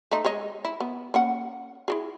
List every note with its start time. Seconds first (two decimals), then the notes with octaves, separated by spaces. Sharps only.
0.11 A3 D#4
0.25 G#3 C#5 D#5
0.65 E4
0.80 B3
1.14 A#3 C#4 F#5
1.88 E4 F#4 G#4